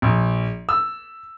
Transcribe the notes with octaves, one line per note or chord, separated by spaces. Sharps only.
A#1
E6